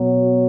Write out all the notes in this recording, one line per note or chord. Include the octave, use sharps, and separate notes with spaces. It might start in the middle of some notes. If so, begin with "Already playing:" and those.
Already playing: B2 F#3